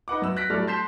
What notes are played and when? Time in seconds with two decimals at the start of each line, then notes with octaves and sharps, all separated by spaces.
0.08 D#4 B4 F#5 D6
0.22 F#2 B4 E6
0.37 F#6 A#6 B6 D7
0.50 F#2 A2 G3 A4 D5 F6
0.67 A5 C6 G6 B6 C7 E7